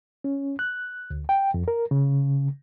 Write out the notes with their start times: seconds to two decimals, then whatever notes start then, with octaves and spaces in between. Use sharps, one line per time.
0.24 C#4
0.59 F#6
1.11 D2
1.29 G5
1.54 F2
1.68 A#4
1.91 C#3